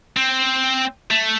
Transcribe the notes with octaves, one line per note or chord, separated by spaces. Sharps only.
C4
A3